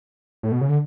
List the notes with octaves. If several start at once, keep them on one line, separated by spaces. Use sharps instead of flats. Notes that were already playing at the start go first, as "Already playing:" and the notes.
A2
B2
C#3
D3